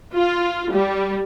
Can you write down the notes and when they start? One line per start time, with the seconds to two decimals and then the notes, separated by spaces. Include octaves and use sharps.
0.14 F4
0.71 G3